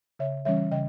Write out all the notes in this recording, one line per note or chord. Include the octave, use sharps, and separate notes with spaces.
C#3 C#5 E5
E3 G3 C#4 C#5 E5
C#3 D#5 G5